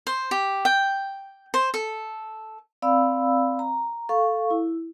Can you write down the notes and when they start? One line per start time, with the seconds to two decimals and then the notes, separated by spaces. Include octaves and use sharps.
0.07 C5
0.31 G4
0.65 G5
1.54 C5
1.74 A4
2.82 C4 D5 F5 B5 E6
3.59 A#5
4.09 A4 F5 C#6
4.50 E4